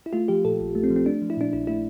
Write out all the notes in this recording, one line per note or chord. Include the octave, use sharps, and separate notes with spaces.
E4
A3 F4
F3 G4
A#2 A4
A#1
A3
C4
F3
C4
A3 D4
F3
E4
A#2 D4
A#1 E4
A3 E4